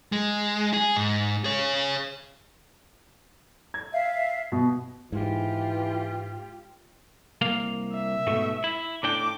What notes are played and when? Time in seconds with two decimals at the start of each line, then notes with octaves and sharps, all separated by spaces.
0.12 G#3
0.74 G#4
0.97 G#2
1.44 G#4 C#5
3.74 G#6
3.92 E5 F5
4.52 B2
5.12 G#2 E3 F4 G4
7.41 C2 A#3 F5
7.94 E5
8.27 G#2 B2 A3
8.64 E4
9.03 A2 D4 G5 D6